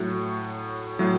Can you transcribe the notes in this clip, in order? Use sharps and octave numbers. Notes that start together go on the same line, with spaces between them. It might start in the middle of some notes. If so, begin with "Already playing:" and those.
Already playing: A2 F#3 F#4
A2 F#3